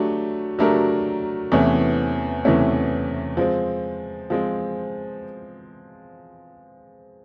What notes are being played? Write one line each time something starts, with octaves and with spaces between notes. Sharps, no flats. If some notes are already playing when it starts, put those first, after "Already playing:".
Already playing: F#3 A3 D4 G4
F#3 A3 D4 G4 A#4
E2 C3 E3 A3 C#4
E2 C3 E3 A3 C#4
F3 G#3 C4
F3 G#3 C4